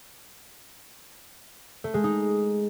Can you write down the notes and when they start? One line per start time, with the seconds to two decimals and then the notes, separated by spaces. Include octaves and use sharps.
1.84 A3
1.94 G#3
2.04 D#4